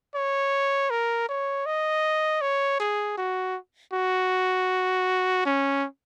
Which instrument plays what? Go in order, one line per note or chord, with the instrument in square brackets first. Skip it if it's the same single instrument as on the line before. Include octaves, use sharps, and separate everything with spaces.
[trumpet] C#5
A#4
C#5
D#5
C#5
G#4
F#4
F#4
C#4